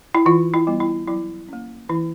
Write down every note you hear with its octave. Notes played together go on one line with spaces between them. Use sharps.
E4
E3 F4
E4
G3 B3
E4
F#3 E4
A#3 C#4
E3 E4